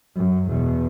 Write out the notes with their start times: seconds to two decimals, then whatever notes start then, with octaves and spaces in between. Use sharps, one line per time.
0.16 F#2
0.50 E2 B2